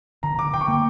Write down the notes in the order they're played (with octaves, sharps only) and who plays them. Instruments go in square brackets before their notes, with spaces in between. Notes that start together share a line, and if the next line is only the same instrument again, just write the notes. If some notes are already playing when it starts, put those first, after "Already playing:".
[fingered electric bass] D3 [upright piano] A#5
[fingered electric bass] D3 [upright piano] D6
[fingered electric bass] D3 [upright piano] G5
[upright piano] C#6
[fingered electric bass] A#3 [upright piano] D6